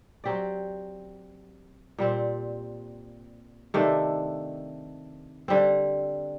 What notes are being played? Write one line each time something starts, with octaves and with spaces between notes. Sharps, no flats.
F#3 C4 G4 D5
A#2 G3 C4
C3 D#3 A3 D4
D3 G3 C4